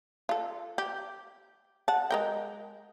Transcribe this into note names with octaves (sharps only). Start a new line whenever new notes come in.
F4 A4
G4
F#5 A5
G#3 A#4 G5